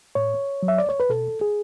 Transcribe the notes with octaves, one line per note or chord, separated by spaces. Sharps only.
A2 C#5
F#3
E5
D5
C#5
B4
B2 A4
G#4